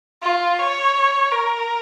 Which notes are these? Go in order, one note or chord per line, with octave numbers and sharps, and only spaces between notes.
F4
C#5
A#4